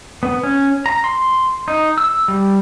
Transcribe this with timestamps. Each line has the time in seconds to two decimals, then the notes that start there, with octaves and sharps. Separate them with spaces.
0.23 B3
0.43 C#4
0.86 A#5
1.04 C6
1.68 D#4
1.98 E6
2.28 G3